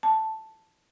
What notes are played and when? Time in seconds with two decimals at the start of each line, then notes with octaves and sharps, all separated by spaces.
0.03 A5